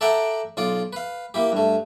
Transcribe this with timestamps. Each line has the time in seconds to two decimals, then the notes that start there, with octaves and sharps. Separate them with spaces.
0.01 A4 D5 E5 F#5 G5 A#5
0.57 B1 F4 D5
0.93 B4 F5
1.34 A#3 E4 G4
1.52 G2 A3